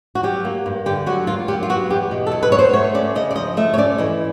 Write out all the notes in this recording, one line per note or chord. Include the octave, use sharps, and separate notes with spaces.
F#4
F#3 G4
A#3
G2
D3 G4
F#3 F#4
A#3 F4
F#3 G4
F4
B3 F#4
E2 G4
B2
A4
F#3
B4
B3 C#5
C5
A3 C#5
C#4 D5
C#3 D#5
D5
F3 D#5
A3 E5
C#5
C#4 D5
E3 D#5